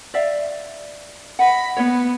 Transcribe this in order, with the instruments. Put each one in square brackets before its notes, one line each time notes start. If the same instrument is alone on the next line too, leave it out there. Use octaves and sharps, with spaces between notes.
[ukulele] D5 E5 F5
[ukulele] D#5 F#5 [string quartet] B5
[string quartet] B3 [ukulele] C#5